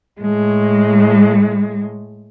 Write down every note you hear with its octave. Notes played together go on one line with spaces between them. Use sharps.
A2 G#3